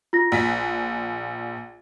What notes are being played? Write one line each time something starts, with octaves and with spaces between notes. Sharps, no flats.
F4 A#6
A#1 B6